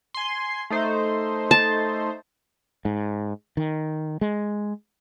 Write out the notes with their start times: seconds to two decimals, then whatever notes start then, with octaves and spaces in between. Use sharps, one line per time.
0.14 G#5 C6
0.70 A3 D#4 C5
1.51 A5
2.85 G#2
3.57 D#3
4.21 G#3